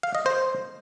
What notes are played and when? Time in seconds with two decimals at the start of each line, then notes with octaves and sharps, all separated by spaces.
0.03 F5
0.15 D#5
0.26 C5